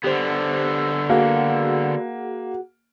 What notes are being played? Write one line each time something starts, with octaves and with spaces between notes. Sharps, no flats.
D3 B3 G4 C5
A#3 F#4 G#4 F#5